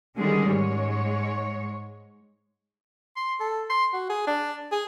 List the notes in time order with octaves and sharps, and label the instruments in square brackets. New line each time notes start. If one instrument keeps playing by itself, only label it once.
[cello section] D3 D#3 G3 G#3 C#4 G#4
G#2 G#3 C#5
[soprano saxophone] C6
A4
C6
F#4
G#4
D4
G#4